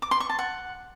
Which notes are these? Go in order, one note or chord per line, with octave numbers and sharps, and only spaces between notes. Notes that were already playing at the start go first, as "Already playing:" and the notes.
D6
C6
C#6
A5
F#5